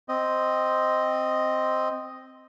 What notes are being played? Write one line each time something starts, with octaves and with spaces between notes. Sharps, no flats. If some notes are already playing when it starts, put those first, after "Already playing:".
C4 D#5